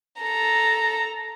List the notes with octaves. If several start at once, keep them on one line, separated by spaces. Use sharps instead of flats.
A4 A#5